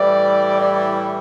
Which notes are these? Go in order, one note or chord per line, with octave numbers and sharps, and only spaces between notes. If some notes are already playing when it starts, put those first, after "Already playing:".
Already playing: A2 E3 G3 D5
D5